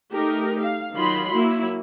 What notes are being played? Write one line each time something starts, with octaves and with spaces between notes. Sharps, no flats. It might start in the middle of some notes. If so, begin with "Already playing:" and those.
A3 D#4 G4 A#4
F5
D#3 F#3 F4 B5 C6
F#3 A#3 E4